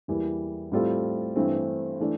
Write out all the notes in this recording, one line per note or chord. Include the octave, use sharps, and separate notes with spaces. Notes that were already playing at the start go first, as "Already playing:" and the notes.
E2 E3 G3 A#3
A2 G3 C4 F4 A4
G2 E3 A3 C4
E3 A3 D4